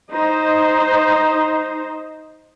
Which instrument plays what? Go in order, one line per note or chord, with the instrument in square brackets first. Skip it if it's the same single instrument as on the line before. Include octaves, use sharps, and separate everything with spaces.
[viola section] D#4 C5